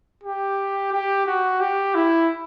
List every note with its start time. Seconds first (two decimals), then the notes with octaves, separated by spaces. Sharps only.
0.23 G4
0.92 G4
1.26 F#4
1.60 G4
1.95 E4